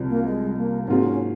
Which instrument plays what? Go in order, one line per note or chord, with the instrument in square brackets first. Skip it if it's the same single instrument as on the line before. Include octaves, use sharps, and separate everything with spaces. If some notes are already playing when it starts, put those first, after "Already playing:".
Already playing: [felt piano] C2 C3 F3
[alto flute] A#3
G#3
A#3
[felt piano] G#2 F#3 A#3 F4 G#4 [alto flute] C4
[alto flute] C#4